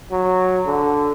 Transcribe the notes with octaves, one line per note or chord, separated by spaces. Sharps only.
F#3
D3